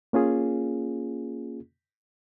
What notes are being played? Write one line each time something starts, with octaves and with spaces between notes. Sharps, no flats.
A#3 C#4 F4 G#4